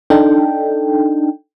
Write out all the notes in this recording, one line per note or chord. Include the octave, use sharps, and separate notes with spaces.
D4 D#4 A4 G5